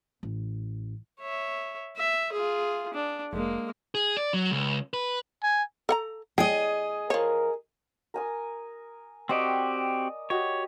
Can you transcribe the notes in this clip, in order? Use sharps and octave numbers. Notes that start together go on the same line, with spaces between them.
A1
C#5 E5
E5
F4 G#4
D4
F1 G#3 A#3
G#4
D5
F#3
C#2
B4
G#5
A4 F#5 A#5
G#4 D#5 G5
F3 A#4 C#5
A#4 G#5 D#6
C4 F#4 G4 D5 D#5
F#4 G4 C#5 D#5